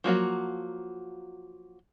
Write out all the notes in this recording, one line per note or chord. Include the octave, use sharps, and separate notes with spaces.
F3 F#3 A#3 F#4